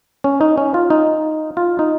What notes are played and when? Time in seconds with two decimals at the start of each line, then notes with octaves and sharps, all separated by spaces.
0.24 C#4
0.41 D#4
0.58 C#4
0.74 F4
0.90 D#4
1.57 F4
1.79 D#4